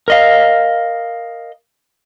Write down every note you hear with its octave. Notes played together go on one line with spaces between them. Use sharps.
A#4 D#5 F5